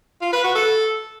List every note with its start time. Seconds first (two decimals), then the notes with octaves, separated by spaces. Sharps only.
0.21 F4
0.33 B4
0.44 F#4
0.55 A4